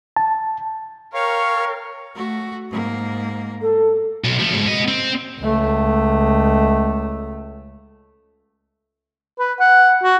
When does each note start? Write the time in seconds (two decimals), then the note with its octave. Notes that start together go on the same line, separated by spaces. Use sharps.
0.17 A5
1.14 A#4 C#5 F5 G5 C#6
2.15 A3 F#4
2.70 G#2 A#3
3.61 A4
4.24 B1
4.39 F3 A3
4.53 G#2 B2
4.67 B3 D#5
4.88 C4
5.40 C#2 A3
9.39 B4
9.60 F#5
10.03 F#4